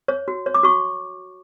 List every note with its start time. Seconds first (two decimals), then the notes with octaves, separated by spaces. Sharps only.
0.08 C#5
0.28 F#4
0.46 C#5
0.54 D6
0.63 F#4 C#6